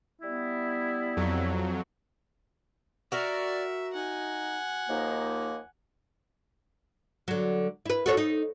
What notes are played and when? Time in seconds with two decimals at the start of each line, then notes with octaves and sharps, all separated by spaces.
0.22 G3 B3 E4
1.17 F2 F#3
3.12 F#4 A#4 D5 E5
3.93 D#4 F#5 G#5
4.89 D#2 F3 A#3 D#4
7.28 D3 F#3
7.86 E4 B4
8.06 F#4 A4 C#5
8.17 D#4